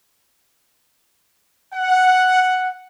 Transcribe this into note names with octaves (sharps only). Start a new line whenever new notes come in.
F#5